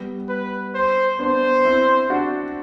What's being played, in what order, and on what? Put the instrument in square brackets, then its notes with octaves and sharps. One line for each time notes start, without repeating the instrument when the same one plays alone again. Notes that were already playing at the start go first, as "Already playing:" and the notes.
Already playing: [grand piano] G3 B3
[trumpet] B4
C5
[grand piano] B3 D4 [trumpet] C5
[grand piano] C4 E4
D4 F#4